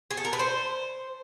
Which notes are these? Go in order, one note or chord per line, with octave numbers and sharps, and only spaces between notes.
G#4
A4
A#4
B4
C5